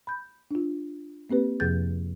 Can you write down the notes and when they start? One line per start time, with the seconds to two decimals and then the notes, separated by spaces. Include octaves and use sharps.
0.07 B5 G6
0.51 D4 F4
1.30 A#3 C4 G4 B4
1.60 F2 C3 F3 G#4 G6 A6